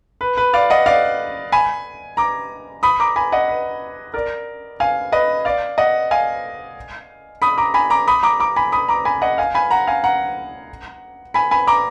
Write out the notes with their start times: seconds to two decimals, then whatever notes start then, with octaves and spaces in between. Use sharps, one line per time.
0.21 B4
0.37 B4
0.53 D5 F5
0.70 D#5 F#5
0.86 D5 F5
1.52 G#5 B5
2.17 A#5 D6
2.83 B5 D#6
3.00 A#5 D6
3.16 G#5 B5
3.32 D#5 F#5
3.48 B4
4.14 A#4 D5
4.80 F5 G#5
5.12 B4 D#5
5.45 D5 F5
5.78 D#5 F#5
6.11 F5 G#5
7.42 B5 D#6
7.58 A#5 D6
7.74 G#5 B5
7.90 A#5 D6
8.07 B5 D#6
8.23 A#5 D6
8.40 A#5 D6
8.56 G#5 B5
8.72 B5 D#6
8.88 A#5 D6
9.05 G#5 B5
9.22 D#5 F#5
9.38 F5 G#5
9.55 G#5 B5
9.71 F#5 A#5
9.87 F5 G#5
10.04 F#5 A#5
11.34 G#5 B5
11.51 G#5 B5
11.67 A#5 D6